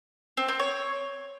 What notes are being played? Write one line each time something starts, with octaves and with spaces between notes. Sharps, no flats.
C4
C4
C#5